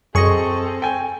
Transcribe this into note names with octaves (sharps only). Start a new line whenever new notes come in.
F#2 C4 G#4 A4 D#5 C#6
G5 G#5